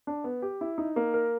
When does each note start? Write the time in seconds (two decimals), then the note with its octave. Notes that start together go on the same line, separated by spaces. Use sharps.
0.07 D4
0.24 B3
0.42 G4
0.61 E4
0.78 D#4
0.96 A#3
1.14 A#4